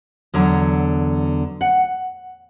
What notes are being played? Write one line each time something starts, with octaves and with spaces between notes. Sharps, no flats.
E2 D3 F#3
F#5